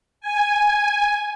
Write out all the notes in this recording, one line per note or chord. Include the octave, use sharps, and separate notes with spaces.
G#5